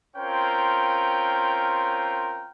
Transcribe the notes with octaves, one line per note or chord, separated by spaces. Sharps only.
C4 C#4 F4 A#4 G5